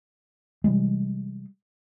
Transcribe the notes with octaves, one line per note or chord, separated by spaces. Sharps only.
C3 E3 G3 G#3